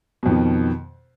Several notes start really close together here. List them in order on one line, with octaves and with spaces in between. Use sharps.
B2 F2 D#3 B3